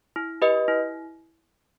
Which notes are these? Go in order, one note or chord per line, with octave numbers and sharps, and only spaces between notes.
E4
G4 B4 D#5
E4